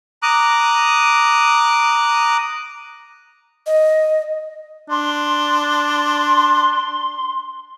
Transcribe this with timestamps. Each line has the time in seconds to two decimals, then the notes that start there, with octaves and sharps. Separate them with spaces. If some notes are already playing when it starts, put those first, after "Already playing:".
0.23 A#5 D6 D#6 F#6
3.66 D#5
4.90 D4 C6